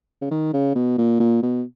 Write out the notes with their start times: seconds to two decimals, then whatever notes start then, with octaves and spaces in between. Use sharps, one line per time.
0.21 C#3
0.31 D#3
0.53 C#3
0.75 B2
0.98 A#2
1.20 A#2
1.43 B2